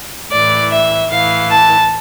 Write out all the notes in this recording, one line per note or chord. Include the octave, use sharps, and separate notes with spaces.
A2 E3 D5
E5
A2 E3 F5
A5